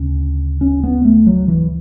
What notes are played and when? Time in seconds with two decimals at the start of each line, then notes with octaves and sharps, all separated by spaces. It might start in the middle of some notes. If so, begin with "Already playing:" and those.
Already playing: D2 C#3 C#4
0.61 C#4
0.84 B3
1.05 A3
1.27 F#3
1.48 E3